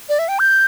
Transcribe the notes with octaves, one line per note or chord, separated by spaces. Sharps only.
D5
E5
G5
G6